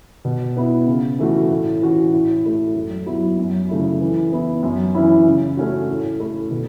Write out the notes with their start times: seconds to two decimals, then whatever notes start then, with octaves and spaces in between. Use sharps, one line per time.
0.25 B2
0.57 B3 E4
0.87 C#3
1.19 E3 A3 F#4
1.50 A2
1.82 E3 C#4 F#4
2.12 A2
2.45 A3 E4
2.75 F#2
3.06 F#3 B3 E4
3.39 F#2
3.69 C#3 A3 E4
4.01 E3
4.33 B3 E4
4.63 F#2
4.95 E3 C#4 E4
5.26 C#3
5.57 A3 C#4 F#4
5.89 A2
6.20 A3 E4
6.51 B2